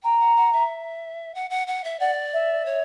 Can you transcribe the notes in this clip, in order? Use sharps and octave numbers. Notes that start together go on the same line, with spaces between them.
G5 A#5
F#5
F#5
E5
F#5
F#5
F#5
E5
D5 F#5
E5
C#5